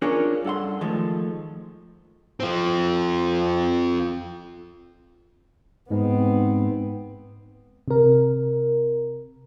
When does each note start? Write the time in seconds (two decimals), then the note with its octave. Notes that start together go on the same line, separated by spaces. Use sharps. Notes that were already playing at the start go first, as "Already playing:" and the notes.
0.02 C#4 D4 F4 G#4 A#4 C#5
0.44 G2 A4 F#5 C6
0.81 D#3 F3 G#3 A3
2.40 F3 C4
5.90 G#2 G#3 B3 C4 D#4
7.88 C3 A#4